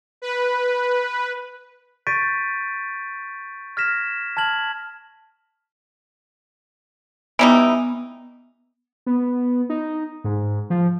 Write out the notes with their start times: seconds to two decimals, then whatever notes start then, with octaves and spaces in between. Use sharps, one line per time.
0.22 B4
2.07 C#6 G6 A6 B6 D7 D#7
3.77 F6 G#6 A#6 B6 E7
4.37 A5 F6 G#6 F#7
7.39 E3 G3 B3 D#4
9.06 B3
9.69 D#4
10.24 G#2
10.70 F3